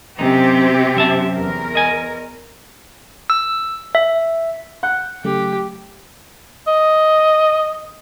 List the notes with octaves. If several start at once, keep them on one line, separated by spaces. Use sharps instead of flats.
F#2 C3 C4 D#4 G4
F#2 E5 A5
E2 A#4
D#5 G#5
E6
E5
F#5 G6
C#3 F#3 A3 G4
D#5